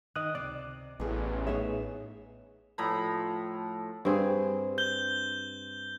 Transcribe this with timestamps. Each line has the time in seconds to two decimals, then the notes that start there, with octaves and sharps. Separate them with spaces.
0.16 D#3 D#5 D#6 F#6
0.35 C#2 C3 D5
1.00 A1 B3 G#4
1.47 A2 B3 D#4 G#4 C#5 E5
2.78 A2 F3 A#5 B5
4.05 G2 C4 G#4
4.78 G6 G7